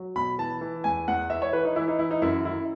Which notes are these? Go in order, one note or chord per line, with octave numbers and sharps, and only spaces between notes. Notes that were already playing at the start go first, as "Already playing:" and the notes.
Already playing: F#3
B2 B5
E3 A5
E3
E2 G#5
E2 F#5
E3 E5
C#5
E3 B4
D#4
E3 E4
D#4
E3 E4
D#4
F#2 E4
D#3 E4